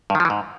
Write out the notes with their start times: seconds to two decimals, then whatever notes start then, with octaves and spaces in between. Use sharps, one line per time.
0.10 G2
0.15 D#3
0.20 F3
0.25 E3
0.30 G#2